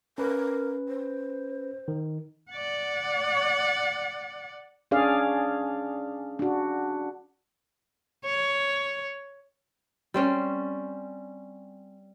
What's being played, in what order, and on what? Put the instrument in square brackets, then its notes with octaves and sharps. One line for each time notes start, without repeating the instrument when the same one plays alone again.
[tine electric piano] C#4 B4 [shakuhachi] A#4
[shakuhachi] C5
[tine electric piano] D#3
[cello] D5 F#5
[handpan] C#4 D4 G#4 D5 F5
D4 F#4
[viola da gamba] C#5
[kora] G3 C4 C#4